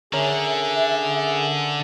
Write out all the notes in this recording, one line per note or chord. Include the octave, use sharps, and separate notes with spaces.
D3 C#4 G#4 A#4 E5